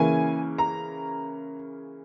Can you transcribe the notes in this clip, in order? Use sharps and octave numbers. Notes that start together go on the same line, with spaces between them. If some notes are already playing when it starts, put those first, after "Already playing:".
Already playing: C#3 E3 A#3 C#4 G#5
A#5